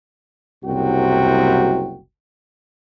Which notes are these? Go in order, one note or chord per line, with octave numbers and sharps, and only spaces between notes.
F#1 C2 C3 F#3 F#4 G5